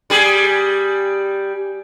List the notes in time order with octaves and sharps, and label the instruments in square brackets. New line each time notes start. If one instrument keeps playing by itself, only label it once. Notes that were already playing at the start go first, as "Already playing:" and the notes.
[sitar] G3 G#4